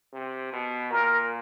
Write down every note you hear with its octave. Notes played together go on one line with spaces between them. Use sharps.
C3
B2
A#2 A#4